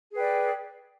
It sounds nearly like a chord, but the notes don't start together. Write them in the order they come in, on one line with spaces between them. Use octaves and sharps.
G#4 B4 G5 D5